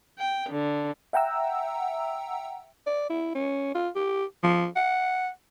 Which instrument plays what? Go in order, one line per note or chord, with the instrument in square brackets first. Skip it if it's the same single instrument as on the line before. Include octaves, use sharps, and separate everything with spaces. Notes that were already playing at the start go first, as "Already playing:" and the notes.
[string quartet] G5
D3
[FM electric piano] E5 F#5 G5 A#5 E6
[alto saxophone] D5
E4
C#4
F4
G4
F3
F#5